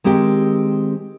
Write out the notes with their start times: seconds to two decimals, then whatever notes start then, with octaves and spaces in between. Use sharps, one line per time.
0.04 D#3 G#3 C4 G4 G5